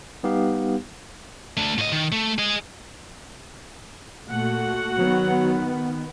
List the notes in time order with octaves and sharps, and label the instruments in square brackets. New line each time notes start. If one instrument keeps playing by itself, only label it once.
[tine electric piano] G3 B3 D#4 G4 F5
[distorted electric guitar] A3 D4
A2 D#5
D#3
A3
G#4 D#5
[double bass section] A#2 A3 [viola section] F#4 F#5
[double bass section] D#3 B3 [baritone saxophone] F#3